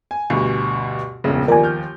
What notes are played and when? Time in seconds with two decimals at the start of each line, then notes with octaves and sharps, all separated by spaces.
0.11 G#5
0.30 D2 G2 B2
1.24 E1 A#1 C#3
1.48 D#2 F3 A#4 D5 G#5
1.63 F6 G6